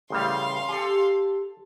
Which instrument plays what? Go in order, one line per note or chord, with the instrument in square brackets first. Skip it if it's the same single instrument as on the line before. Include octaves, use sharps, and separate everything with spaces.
[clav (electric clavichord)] A1 C#3 G3 [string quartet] F5 C6
[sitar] G4 A4 [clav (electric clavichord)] G#5